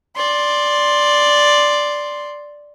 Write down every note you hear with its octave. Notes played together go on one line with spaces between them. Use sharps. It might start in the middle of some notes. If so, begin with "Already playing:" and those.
D5 C6